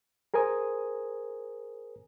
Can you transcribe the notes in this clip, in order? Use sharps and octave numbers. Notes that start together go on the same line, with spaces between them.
G#4 A#4 C5 G#5 D#6